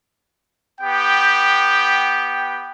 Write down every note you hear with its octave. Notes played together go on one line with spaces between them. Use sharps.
B3 G4 G5